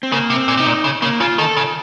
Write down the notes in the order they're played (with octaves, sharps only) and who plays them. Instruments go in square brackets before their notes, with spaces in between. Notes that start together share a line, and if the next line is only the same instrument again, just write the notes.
[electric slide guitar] C4
[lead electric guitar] C#3 [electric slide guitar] A#3
[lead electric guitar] C3
[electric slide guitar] C4
[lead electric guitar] A#2
[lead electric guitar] C3 [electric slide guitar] D#4
[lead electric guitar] A#2
C#3
[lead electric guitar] C#3 [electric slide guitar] A#3
[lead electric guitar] C#3 [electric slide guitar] F4
[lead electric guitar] D#3 [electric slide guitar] A4
[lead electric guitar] C#3